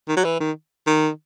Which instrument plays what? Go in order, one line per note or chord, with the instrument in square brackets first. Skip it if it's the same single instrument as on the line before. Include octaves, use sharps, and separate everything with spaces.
[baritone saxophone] D#3
F#3
E3
D#3
D#3